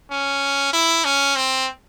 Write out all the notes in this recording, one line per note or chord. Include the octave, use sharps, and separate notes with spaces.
C#4
E4
C#4
C4